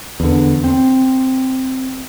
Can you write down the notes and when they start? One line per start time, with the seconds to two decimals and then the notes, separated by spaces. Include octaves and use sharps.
0.20 E2 D3
0.64 C4